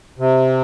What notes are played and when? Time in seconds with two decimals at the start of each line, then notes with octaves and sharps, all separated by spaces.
0.19 C3